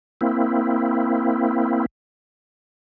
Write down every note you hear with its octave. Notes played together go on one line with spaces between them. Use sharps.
A#3 C4 E4